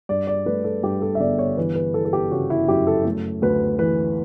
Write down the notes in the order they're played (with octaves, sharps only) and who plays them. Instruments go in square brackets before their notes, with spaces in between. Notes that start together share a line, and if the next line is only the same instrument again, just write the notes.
[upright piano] G2 D5
D5
A3 B4
A4
G2 G4
A4
E5
G1 D5
C#5
E3 B4
B4
E3 A4
A4
G4
C#3 F#4
E4
F#2 G4
A4
A3
D2 B4
E3 B4